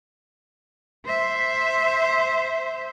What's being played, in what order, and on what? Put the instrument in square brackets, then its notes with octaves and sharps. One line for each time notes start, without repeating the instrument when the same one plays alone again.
[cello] C5 E5